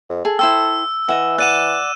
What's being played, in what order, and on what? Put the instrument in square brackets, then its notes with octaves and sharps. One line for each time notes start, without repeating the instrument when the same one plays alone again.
[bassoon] F2
[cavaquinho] G#4 [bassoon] A4
[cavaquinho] E4 C5 G5 [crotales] E6
[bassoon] E3 [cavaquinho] D#5 E5 F#5
[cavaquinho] D5 F#5 [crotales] F#6 D#7 E7